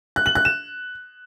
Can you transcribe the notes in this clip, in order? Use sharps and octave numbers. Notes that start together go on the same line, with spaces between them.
F#6
F#7
F#6
E7